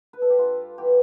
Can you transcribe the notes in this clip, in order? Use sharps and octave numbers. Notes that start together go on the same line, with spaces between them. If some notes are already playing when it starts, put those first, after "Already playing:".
B4
A4
G4
G2 F4
E3 B3 G4